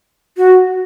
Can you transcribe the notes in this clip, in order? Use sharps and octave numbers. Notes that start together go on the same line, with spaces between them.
F#4